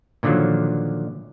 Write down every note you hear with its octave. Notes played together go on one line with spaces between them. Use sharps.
A#2 D3 D#3 F3 F#3